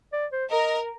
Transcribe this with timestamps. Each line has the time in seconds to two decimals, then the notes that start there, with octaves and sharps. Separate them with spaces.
0.13 D5
0.32 C5
0.50 A#4 D#5